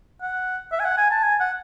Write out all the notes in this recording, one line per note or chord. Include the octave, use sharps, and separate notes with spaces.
F#5
E5
G#5
F#5
G#5
A5
G#5
F#5